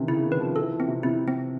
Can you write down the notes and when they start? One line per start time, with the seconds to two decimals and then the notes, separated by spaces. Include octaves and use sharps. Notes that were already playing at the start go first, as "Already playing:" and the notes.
Already playing: C3 D#3 E3 C#4
0.08 C#3 E4
0.25 D#3
0.32 B4
0.40 F3
0.56 A4
0.61 E3
0.72 F3
0.80 C4
0.88 C3
1.03 C3 E4
1.28 C4